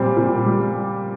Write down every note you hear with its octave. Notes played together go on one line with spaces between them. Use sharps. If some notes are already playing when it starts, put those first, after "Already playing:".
Already playing: A#2 G3 C4
A#2
G3